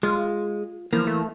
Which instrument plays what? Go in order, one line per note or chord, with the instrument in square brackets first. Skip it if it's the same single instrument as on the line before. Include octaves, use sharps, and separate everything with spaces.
[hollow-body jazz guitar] G#3 [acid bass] F4
[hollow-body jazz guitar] E3 A#3 [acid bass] F3
[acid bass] A3